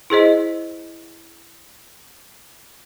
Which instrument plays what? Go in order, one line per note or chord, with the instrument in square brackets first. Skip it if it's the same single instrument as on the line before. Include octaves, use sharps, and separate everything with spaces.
[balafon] E4 G#4 C5 D#5